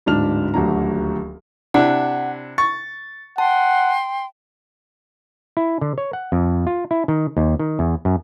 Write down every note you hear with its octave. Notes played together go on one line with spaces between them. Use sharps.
D1 G#2 D4 F6 F7
D#1 D2 F#3 D4 A#5
C3 D4 E4 F#5
C#6 A6
F#5 G5 A5 C6
E4
D3
C#5
F#5
F2
F4
E4
D#3
D#2
D#3
E2
F#2